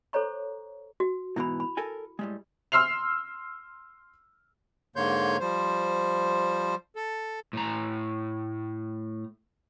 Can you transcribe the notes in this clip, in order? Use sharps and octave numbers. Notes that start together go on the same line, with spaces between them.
A4 C5 C#5 A#5 C#6
F#4
G#2 B2 E3 E4 B5
B5
A4 A#4 G#5
A2 G3 G#3
C6 E6 F6 C7 F7
G#2 D3 A#3 C#5 C6 G6
F3 G3 C5
A4
A2 A#5